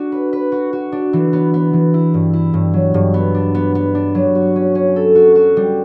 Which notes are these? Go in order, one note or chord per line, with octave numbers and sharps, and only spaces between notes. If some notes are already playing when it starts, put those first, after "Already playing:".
Already playing: D4 F#4
B4
B4
F#4
F#4
D4
E3
B3
B3
E3
E4
G2
E4
G2
F#3
G2
B3
D4
B3
B3
D4
F#3
F#4
C#4
C#4
A4
F#4
F#4
G3